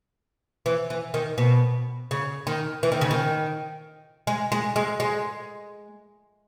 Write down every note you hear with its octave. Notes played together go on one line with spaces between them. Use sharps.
E3
E3
D#3
B2
C#3
D#3
E3
D#3
C#3
D#3
G#3
G#3
G#3
G#3